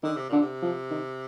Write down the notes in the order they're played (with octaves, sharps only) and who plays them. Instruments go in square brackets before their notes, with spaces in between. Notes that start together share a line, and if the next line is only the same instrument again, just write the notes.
[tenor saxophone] D3 [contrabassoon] D#3
[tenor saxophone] C3
[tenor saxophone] A#2 [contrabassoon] D3
[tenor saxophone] C3
[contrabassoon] F3
D#3